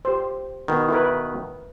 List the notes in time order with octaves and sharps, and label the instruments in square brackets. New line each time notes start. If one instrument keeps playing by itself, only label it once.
[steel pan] G4 C5
[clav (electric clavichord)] B2 D#3
[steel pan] E4 A#4 B4